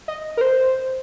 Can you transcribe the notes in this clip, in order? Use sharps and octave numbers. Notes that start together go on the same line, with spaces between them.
D#5
A#4
C5